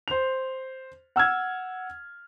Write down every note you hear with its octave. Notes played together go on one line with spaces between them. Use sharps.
C5 F7
F#5 E6 F6 G#6